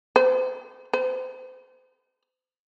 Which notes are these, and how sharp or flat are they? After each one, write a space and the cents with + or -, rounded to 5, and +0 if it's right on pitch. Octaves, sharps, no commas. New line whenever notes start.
C5 -35
C5 -30